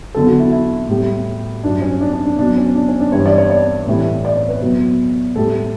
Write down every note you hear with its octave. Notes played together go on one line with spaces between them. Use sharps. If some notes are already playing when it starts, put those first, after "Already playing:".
E2 D3 F#3 A4
F#4
E4
E4
A2 G3
G2 F#3 D4
C#4
D4
D4
D4
B2 F#3 D4
C#4
D4
C#4
D4
G2 E3 G3 C#5
D5
C#5
D5
A2 E3 G3
D5
C#5
B4
B2 F#3
A2 G3 A4